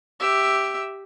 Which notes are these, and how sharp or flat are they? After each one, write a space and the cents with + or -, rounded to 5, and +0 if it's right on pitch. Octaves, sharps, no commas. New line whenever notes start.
G4 +0 E5 +0